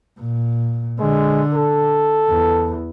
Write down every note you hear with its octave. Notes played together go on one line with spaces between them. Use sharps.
A#2
D3 G#3
A4
E2